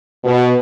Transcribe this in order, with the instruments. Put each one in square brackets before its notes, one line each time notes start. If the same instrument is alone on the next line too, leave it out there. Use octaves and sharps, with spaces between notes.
[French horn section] B2